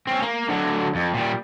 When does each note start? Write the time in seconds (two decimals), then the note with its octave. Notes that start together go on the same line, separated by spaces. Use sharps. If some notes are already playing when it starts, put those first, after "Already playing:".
0.07 C4 C#4
0.22 A#3
0.49 D3 F#3
0.95 F2
1.14 A#2 G3